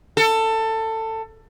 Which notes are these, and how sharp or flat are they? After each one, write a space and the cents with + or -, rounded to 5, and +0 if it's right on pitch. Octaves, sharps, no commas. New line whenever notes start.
A4 +20